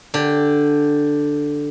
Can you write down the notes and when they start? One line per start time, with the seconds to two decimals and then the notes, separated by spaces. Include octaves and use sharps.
0.14 D3 G4